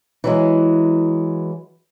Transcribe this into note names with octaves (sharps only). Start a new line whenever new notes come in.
E3 F#3 G#3